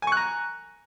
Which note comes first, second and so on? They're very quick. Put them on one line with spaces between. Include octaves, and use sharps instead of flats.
G#5 C#6 F#6 A#5